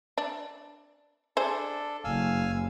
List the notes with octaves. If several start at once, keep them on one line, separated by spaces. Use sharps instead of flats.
D4
D4 G#4 A4 C5
F#1 F5 G#5 E6